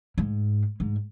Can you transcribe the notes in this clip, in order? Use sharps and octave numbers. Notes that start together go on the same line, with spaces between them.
G#2
G#2